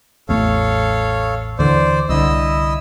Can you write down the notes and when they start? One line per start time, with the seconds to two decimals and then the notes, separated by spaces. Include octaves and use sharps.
0.29 A1 E2 A3 A4 C#5 F5
1.59 D#2 D3 E3 C5 D5
2.09 C2 D3 E4 D#5 E6